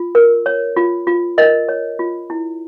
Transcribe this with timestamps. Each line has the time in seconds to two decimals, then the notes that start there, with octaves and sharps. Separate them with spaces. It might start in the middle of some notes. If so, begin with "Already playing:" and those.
Already playing: F4
0.15 A#4
0.46 C#5
0.76 F4
1.07 F4
1.38 A#4 D#5
1.69 C#5
1.99 F4
2.30 E4